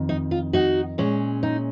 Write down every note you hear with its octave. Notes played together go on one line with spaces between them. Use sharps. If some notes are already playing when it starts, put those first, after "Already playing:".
Already playing: F2 D#3
D#4
F4
D#4 F#4
A#2 G#3 C#4
D#4